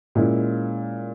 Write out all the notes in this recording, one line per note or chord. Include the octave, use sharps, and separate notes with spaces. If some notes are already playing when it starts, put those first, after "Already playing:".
A#2 G#3 C#4 E4